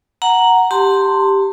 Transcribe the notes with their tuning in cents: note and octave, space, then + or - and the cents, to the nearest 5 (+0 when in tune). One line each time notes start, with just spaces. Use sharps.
F#5 +0 A#5 +0
G4 +0 A5 +35 C6 +0